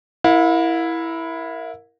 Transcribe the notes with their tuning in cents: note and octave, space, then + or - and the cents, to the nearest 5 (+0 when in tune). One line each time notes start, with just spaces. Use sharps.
E4 +0 A#4 +0 F5 +45